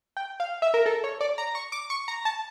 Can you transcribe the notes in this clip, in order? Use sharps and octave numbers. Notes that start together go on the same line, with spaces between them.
G5
F5
E5
A#4
A4
C#5
D5
A#5
C#6
D6
C#6
A#5
A5